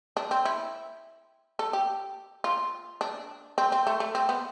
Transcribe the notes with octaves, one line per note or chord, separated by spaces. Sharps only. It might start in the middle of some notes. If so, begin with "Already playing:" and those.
D4
C4
E4
A4
G4
F4
D4
C4
C4
A3
A3
C4
B3